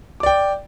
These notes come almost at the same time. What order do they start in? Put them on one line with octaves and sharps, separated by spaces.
D6 D5 G5